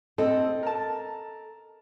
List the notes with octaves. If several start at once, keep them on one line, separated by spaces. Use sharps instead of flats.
C4 A4 D#5
A#4 A5